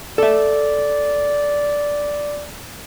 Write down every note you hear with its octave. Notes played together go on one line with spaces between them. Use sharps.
A4 D5 E5